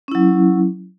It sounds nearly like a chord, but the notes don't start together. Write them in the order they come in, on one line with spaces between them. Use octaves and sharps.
C#4 E4 F#3